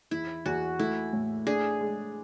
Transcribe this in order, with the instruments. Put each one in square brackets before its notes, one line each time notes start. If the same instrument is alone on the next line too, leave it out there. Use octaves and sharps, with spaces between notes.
[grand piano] E2 [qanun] E4
[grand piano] E2 [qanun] F#4
[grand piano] A3 [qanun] E4
[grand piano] A2
[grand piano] D4 [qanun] G#4
[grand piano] G#3